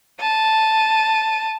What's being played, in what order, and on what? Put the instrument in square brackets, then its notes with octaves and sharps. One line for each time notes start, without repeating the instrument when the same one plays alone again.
[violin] A5 D#7